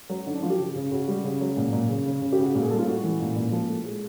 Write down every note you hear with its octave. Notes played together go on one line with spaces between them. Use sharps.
F#3
D3 D#4
D4
F3 F4
G4
C#3
C#3
C#3 F#4
G3
C#3
F#3
A#2
A#2
C#3
C#3
C#3
G4
C#3
F#4
A#2 F#4
G#4
G3 A4
F4
A2 F#4
E3
A#2
A#2
F3
A2
G#3